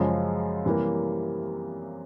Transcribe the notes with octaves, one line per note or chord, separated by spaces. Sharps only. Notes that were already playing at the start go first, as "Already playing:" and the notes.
Already playing: F#2 C#3 F3 G#3
C3 E3 G3 A#3